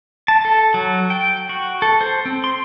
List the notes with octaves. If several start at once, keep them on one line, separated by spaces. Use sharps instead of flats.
A5
A4
F#3
G5
F#4
A4
C5
C4
C6